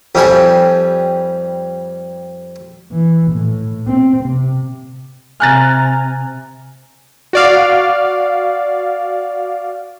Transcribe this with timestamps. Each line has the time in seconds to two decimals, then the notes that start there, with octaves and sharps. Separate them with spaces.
0.15 F2 G3 G#5
2.92 E3
3.32 A2
3.87 C4
4.25 C3
5.40 C3 G#5 A#5 F6 F#6 A6
7.33 F#4 D5 F5